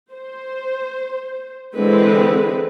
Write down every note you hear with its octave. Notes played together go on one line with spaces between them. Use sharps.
C5
D3 E3 G#3 C4 B4